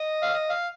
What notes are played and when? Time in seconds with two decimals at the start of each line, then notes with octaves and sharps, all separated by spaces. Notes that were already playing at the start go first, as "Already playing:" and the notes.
Already playing: D#5
0.23 F5
0.34 D#5
0.50 F5